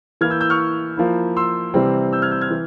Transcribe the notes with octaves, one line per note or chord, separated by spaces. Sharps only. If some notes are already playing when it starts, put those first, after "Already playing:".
E3 A#3 E4 F6 G#6
E6 G6
E6 G6
C#6 F6
F3 A#3 E4
C6 E6
C3 E3 G3 C4
E6 G6
F6 G#6
E6 G6
F6 G#6
E3